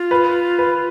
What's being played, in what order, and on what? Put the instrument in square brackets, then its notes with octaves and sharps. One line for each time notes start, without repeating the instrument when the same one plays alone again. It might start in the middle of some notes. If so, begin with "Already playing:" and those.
Already playing: [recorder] F4
[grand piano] B4
B4